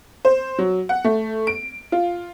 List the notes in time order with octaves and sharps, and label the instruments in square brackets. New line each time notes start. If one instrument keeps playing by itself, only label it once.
[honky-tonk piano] C5
F#3
F#5
A3
D7
F4